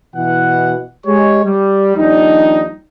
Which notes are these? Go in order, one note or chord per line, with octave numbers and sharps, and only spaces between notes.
B2 E3 F#5
G#3 G4 C#5
G3
D#2 F3 G3 D4 D#4